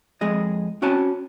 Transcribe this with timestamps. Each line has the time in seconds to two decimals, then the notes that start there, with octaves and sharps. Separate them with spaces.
0.21 F2 G#3 G#4 D#5
0.82 C4 C#4 F#4 C#5 G#5 A5